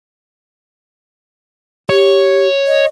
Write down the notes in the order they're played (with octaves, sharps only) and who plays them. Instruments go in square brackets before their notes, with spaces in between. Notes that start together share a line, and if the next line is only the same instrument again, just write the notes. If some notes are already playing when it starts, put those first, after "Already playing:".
[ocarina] G4 [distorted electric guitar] C#5
[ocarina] D#5